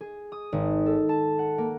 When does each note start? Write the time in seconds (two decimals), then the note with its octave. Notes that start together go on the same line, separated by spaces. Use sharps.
0.01 G#4
0.32 D#6
0.52 G#1
0.86 A4
1.09 A5
1.39 F#5
1.58 A#3